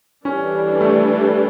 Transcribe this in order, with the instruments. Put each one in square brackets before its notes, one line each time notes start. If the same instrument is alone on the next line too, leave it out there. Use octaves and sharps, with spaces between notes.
[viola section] E3 G3 D4 A4 [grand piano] C#4
[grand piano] A3